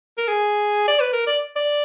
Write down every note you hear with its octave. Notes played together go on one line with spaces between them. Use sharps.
A#4
G#4
D5
B4
A#4
D5
D5